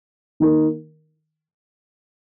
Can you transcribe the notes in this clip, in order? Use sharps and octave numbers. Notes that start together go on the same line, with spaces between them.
D#3 A#3 D#4 A#4